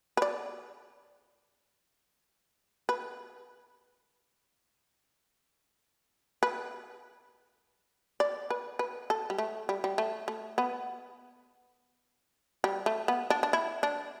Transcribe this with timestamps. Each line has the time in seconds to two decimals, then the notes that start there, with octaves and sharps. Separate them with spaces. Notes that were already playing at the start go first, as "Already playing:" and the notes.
0.17 B4
0.22 D5
2.89 B4
6.43 B4
8.20 D5
8.50 B4
8.79 B4
9.10 A4
9.30 G3
9.38 A3
9.69 G3
9.84 G3
9.98 A3
10.28 A3
10.58 B3
12.64 G3
12.86 A3
13.08 B3
13.30 D4
13.43 D4
13.53 E4
13.83 D4